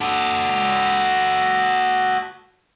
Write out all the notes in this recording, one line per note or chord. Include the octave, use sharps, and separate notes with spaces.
F#4 A4